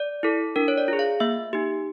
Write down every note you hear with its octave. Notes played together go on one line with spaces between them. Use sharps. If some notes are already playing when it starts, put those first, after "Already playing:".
Already playing: D5
E4 A4
D4 A#4
C#5
D5
F4 G#4
F5
A#3 E5
D#4 G4